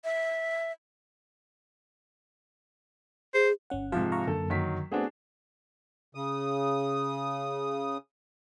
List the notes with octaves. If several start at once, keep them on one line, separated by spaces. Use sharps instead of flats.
E5
G#4 C5
G1 C#4 F#5
G#2 C3 F3 F5
F5 A#5 C#6
F#2 D3 A#3 A4
D#3 F#3 B6
A3 B3 C4 D4 F#4 G#4
C#3 D#6